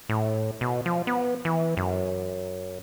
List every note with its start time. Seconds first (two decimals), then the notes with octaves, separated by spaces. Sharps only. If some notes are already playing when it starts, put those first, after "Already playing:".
0.09 A2
0.61 B2
0.86 F3
1.07 B3
1.45 E3
1.77 F#2